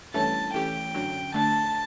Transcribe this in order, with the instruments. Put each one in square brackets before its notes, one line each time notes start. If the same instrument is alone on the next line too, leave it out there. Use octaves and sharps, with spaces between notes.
[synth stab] G2 E3 A3 C#4 [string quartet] A5
[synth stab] E3 A3 C#4 G4 [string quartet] G5
[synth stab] F#2 D3 F#3
[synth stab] D3 A3 D4 [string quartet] A5